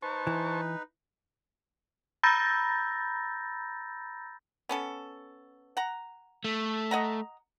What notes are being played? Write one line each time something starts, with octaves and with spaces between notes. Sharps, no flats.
D#4 B4 C5 A5 C#6
E3
A#5 B5 E6 G6 A6 A#6
B3 C#4 A4
F#5 A#5
A3
D#5 F#5 A#5